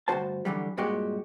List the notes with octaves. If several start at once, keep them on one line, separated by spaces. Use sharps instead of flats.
D2 G2 F3 F#4 C5 A5
D3 E3 F#3 G3
G2 A#2 G#3 F#4 G4